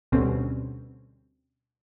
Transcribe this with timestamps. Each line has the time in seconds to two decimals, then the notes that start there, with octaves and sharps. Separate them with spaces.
0.12 D2 B2 D3 G3 C4 C#4